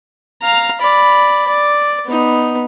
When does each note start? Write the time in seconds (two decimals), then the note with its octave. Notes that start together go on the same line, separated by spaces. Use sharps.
0.42 F5 A#5
0.81 D5 B5
1.48 D5
2.07 B3 D#4